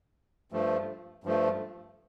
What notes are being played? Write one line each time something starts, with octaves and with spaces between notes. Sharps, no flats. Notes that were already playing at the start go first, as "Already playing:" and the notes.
G2 F3 A3
G2 F3 A3